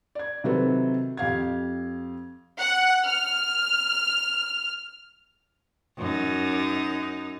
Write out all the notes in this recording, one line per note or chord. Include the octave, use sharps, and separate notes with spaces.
D5 G#6
C3 D#3 F#3 C4 A4 B4
F2 G4 F5 G#6
F#5
F6
F#2 D#4